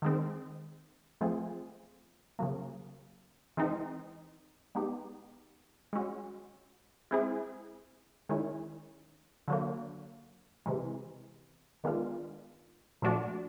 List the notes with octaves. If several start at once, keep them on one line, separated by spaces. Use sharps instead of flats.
D#3 G#3 C4
F3 A3 C4 F4 G#4
C#3 F#3 A#3
E3 G#3 C4 D#4
G#3 B3 D#4 G4
G#3 C#4 F#4
G#3 C4 E4 G#4
D#3 G#3 C#4 E4
D3 F#3 A#3
C3 E3 G#3
D#3 G#3 B3 D4 F4
A#2 F3 A3 D4 F#4